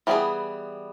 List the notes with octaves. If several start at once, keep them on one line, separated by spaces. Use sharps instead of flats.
E3 G3 B3 D#4 G#4